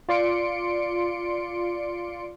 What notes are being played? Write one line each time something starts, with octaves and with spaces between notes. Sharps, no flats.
F4 D5 C6 C#7 D7